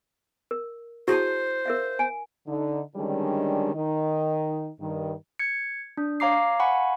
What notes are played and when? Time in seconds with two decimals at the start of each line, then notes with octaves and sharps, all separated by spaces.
0.51 A#4
1.08 E4 F#4 G#4 C5 A5
1.66 A#4 E5 F5
1.99 G#5
2.47 D3 D#4
2.96 D3 D#3 G3 G#3 C#4 D4
3.75 D#3 D#4
4.80 G2 D#3
5.39 G#6 C#7
5.97 D4
6.20 C#5 F5 A#5 D6 C7
6.60 F5 F#5 G#5 B5 C#6